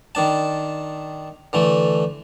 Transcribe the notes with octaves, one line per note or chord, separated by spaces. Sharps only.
D#3 D4 A5
D3 E3 A3